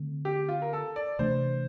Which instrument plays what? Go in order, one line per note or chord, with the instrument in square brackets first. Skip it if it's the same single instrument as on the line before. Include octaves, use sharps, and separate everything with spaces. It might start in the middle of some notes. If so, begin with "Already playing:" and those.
Already playing: [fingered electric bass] D3 A3 C4
[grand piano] G4
F4
A#4
A4
D5
[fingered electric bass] C3 E3 A3 D4 [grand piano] C5